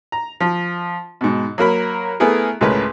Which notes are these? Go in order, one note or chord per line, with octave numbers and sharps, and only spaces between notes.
A#5
F3
G#2 B2
F#3 A#3 A#4 B5
A3 B3 E4 G#4 A#4
C#2 A2 C#3 G#3 A#4 B4